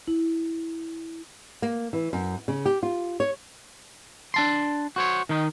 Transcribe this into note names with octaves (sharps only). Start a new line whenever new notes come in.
E4
A#3
E3
F#2
C#3
G4
F4
C#5
D4 A5 C6
F#4 C5 C#5
D#3 D#4